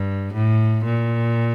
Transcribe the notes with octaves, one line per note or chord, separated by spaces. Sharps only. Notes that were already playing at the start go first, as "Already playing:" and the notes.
Already playing: G2
A2
A#2